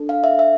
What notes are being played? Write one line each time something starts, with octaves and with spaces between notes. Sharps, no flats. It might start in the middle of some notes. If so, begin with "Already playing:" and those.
Already playing: D4 A4
F5
E5
E5